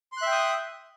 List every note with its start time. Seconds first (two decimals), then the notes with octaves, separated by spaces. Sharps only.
0.12 C6
0.17 F#6
0.22 E5
0.27 G5
0.32 D#6